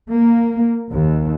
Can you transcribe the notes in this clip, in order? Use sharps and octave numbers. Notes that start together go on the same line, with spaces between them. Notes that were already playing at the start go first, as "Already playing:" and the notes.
A#3
D#2